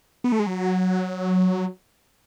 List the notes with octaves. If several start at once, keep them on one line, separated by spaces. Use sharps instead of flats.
B3
A3
G#3
F#3